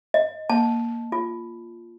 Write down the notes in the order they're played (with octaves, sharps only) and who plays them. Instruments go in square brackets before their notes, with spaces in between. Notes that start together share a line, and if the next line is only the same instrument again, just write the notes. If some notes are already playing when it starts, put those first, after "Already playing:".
[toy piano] D#5
[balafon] A#3 [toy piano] A5
[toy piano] F4